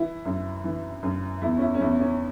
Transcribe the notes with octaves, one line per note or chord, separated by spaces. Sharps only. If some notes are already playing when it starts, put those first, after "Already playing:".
Already playing: E3 E4
F#2
E3
F#2
E2 E4
C#4
E4
C#4
E2 E4
C#4